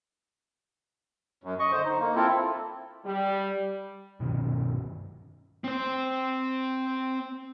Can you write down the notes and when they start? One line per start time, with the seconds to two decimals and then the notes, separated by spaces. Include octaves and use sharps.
1.44 F#2
1.59 D#5 C#6
1.72 D3 C5
1.84 D#4
1.99 A#3
2.15 C4 E4 F4 A4
3.04 G3
4.20 G2 B2 D#3 C#4
5.64 C4 C5